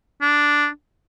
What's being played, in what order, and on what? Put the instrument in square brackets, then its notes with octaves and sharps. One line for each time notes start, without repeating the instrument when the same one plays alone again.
[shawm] D4